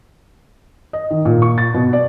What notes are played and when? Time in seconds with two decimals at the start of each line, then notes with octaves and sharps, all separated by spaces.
0.93 D#5
1.11 D#3
1.25 A#2
1.42 C#6
1.58 A6
1.74 B2
1.93 D5